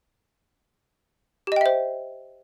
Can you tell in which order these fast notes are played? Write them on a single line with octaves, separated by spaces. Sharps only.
G4 D#5 G5 E5 C5